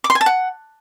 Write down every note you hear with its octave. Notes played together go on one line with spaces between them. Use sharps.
D6
C6
G#5
A5
F#5